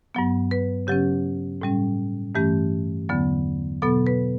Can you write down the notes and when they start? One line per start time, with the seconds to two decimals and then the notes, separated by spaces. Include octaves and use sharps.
0.15 G2 F#3 B3
0.51 B4
0.87 C#3 F#3 C#4 G4
1.62 A2 G3 C#4
2.35 G2 E3 A3 C#4 G4
3.09 E2 D3 F#3 B3
3.82 B2 F#3 B3 A4
4.07 B4